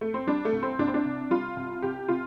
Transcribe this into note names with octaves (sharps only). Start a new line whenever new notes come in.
A3
C4
G3 D4
A3
C2
C4
C2 D4
C4
D4
C3
G3 F4
C2
C2 G4
C3 F4